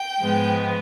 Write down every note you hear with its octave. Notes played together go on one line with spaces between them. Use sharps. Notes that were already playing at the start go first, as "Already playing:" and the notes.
Already playing: G5
G#2 F3 G#3 B3